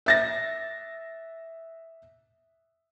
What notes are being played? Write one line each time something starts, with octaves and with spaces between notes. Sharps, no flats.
E5 A6 A#6